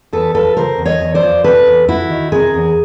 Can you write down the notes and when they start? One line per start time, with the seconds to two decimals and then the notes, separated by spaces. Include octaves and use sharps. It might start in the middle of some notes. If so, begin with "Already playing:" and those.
0.12 E2 A4 B4
0.34 F3 A4 B4
0.57 C#3 A#4 C5
0.78 E2
0.85 C#5 D#5
1.00 E2
1.14 C5 D5
1.23 F3
1.44 C3 A4 B4
1.67 E2
1.88 E2 E4 F#4
2.10 D#3
2.32 C3 G#4 A#4
2.54 E2